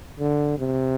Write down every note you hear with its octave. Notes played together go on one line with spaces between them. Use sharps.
D3
C3